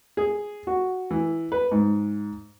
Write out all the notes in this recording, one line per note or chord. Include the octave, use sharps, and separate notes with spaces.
G#4
F#4
E3
B4
G#2